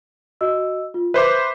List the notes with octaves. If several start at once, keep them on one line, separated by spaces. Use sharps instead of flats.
F#4 D#5 E6
F4
B4 C5 E5 D6